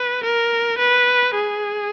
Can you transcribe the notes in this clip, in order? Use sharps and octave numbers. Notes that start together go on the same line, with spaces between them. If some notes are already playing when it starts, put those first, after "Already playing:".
Already playing: B4
A#4
B4
G#4